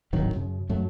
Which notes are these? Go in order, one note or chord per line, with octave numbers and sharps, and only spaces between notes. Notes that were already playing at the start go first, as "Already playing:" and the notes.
D1 G#1 D#3 F#3
F#2 C#3
F#2 F#3 A3